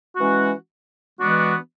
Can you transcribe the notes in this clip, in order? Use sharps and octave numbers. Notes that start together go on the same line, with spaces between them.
E3 G#3 C#4 F#4
E3 G#3 B3 D4 F#4